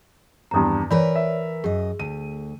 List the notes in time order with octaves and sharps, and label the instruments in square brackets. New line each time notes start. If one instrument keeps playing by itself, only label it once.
[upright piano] G#1 E2 G2 [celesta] A#5 D#6
[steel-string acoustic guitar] E3 A#4 B4 [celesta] C#5 D5 [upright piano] B5
[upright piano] E5
[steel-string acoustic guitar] F#2 D#5 [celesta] G#4
[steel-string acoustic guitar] D2 [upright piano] D#7